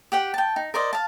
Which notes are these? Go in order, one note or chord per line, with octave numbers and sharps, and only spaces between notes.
G4 F#5 G5
G5 A5
D#4
A#4 C5 D5 D#5
F5 A5